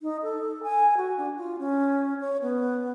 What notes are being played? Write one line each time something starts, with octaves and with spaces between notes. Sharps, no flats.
D#4
A4
G#5
F#4
D4
F4
C#4
C#5
B3